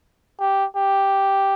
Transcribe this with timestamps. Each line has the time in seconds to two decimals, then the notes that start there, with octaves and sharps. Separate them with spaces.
0.40 G4
0.76 G4